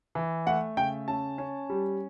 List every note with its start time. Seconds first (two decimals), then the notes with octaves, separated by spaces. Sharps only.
0.15 E3
0.46 A3 F#5
0.77 C#3 G5
1.08 C#4 A5
1.38 C#4
1.70 G3